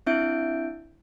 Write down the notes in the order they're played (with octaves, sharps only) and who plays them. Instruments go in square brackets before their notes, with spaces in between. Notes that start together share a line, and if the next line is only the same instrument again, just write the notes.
[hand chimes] C4 D4 E4 E5 G6 D7